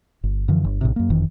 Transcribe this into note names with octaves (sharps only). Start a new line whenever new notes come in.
G1
F#2 D3 E3 F3
G1
A#1 A2 C3
F#2 A#3
F#1 F2 D#3 E3